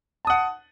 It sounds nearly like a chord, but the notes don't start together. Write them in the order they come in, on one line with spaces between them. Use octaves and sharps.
A5 D#6 F#5